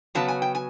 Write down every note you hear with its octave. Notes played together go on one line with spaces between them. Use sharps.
C#3 F#3 B3 A5
G#5
G5
G#5